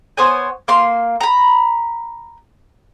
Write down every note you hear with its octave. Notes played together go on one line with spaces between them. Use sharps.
B3 C5 C#5 G#5
A#3 C6
A#5 B5